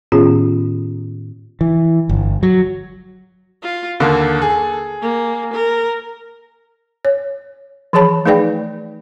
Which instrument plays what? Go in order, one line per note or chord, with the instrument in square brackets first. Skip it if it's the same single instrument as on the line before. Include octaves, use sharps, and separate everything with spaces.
[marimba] A2 D#3 B3 C#4 F4 G#4
[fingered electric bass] E3
G1
F#3
[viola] F4
[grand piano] D#2 D3 A#3 [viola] A4
[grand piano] G#4
[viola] A#3
A#4
[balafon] C#5
E3 F3 G#4 C#5 A5 B5
A3 D#4 G#4 B4 D5 G5